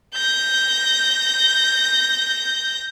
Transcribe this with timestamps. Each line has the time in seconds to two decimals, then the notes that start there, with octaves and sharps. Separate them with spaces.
0.14 G6 A#6